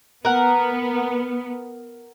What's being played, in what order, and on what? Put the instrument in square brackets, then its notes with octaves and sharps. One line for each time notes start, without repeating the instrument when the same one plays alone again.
[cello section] B3 [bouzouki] A#4 F#5